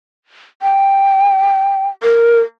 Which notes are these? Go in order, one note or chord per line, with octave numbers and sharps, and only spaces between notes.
G5
A#4